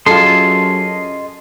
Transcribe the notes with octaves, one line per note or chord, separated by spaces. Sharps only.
F#2 F4 G#4 A4 D#5 A5 C6 C7